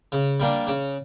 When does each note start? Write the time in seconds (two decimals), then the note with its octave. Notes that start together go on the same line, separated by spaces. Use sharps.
0.12 C#3
0.40 G3 A#3 D4
0.67 C#3